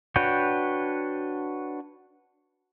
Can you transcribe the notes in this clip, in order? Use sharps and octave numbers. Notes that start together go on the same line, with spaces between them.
D4 F#4 B4 C#5 G5